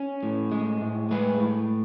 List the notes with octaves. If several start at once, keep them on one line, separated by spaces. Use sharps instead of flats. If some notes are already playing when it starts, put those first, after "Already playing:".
Already playing: C#4
A2
G#3
A2
G#3 B4
A2